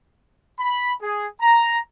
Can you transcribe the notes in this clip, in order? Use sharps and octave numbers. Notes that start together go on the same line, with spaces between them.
B5
G#4
A#5